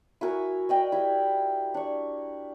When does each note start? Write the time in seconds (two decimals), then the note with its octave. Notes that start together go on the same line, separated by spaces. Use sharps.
0.21 E4 F#4 A#4 G#5
0.69 D5 D#5 G5
0.92 E4 G4
1.74 D4 C#6